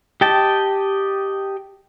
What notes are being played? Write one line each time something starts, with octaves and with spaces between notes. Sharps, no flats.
G4 D#5 G5 A5